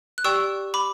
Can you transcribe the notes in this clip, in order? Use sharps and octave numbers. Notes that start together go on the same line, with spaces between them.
F#6
G4 D5 G5 C#6 E6
B5 D6